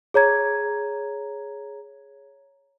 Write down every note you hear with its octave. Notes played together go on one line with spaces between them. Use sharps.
G#4 C#5 A#5 G#6